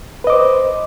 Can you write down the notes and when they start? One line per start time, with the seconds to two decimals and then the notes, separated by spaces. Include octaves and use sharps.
0.24 B4
0.27 D#5
0.30 D6
0.33 C5